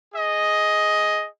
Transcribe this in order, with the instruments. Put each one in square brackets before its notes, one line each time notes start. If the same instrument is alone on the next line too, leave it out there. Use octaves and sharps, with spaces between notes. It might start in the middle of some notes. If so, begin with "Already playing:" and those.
[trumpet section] G#4 D#5